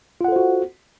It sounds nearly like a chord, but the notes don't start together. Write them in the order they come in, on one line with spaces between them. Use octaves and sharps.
F4 F#5 A4 C5 F#4